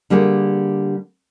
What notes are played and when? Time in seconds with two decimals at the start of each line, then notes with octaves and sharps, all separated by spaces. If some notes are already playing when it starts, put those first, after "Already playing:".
0.10 D3 G3 A#3 G#4